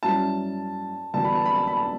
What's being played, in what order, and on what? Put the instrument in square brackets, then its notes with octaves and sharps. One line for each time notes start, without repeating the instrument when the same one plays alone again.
[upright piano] G2 F#3 C#4 E4 [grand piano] A5
[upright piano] E2 D3 G3 B3 F#4 [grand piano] A5
[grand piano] B5
A5
B5
A5
B5
A5